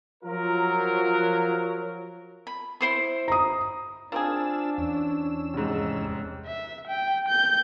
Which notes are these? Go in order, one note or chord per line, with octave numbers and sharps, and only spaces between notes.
F3 F#3 F4 A#4
B5
E4 C5 C6
A#5 D#6
A#3 C4 D4 F4 G#4 A5 E6
E2 C#4 E6
F1 G#2
E5
G5
G6